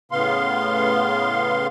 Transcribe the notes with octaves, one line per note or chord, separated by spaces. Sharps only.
A2 C#3 B3 F5 C6